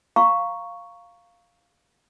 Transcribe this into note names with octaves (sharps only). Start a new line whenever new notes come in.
F5 A#5 C#6